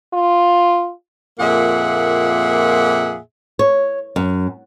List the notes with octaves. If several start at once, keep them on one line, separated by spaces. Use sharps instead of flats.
F4
F2 A#2 A#3 G#4 E5 F#5
C#5
F#2